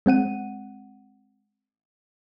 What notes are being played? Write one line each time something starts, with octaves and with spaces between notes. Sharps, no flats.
G#3 C4 F#5 D#7